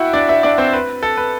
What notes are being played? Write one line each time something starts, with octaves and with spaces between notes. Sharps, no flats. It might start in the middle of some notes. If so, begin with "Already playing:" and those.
Already playing: E4 F#4 E5 F#5 G5
D4 D5
E4 E5
D4 D5
C4 C5
B4
A4
B4